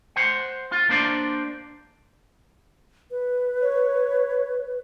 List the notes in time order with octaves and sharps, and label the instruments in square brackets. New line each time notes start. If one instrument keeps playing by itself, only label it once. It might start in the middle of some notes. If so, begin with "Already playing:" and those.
[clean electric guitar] C5 F#5
F4
A#3 D4 C5 D5
[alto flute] B4
[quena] C#5